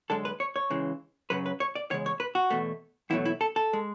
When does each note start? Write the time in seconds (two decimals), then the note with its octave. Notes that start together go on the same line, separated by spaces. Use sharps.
0.10 F#2 D3 G#3 A4
0.25 B4
0.40 C#5
0.56 C#5
0.70 C#2 C#3 E3 G#3
1.30 F#2 C#3 F#3 B4
1.46 B4
1.60 C#5
1.75 D5
1.90 E2 C#3 G#3 C#5
2.06 C#5
2.20 B4
2.35 F#4
2.50 E2 B2 A3
3.10 E2 B2 F#3 A3 E4
3.25 E4
3.41 A4
3.56 A4
3.73 G#3